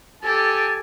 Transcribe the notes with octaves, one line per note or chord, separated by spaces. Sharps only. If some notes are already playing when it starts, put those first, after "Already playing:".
G4 A4 G#5 A6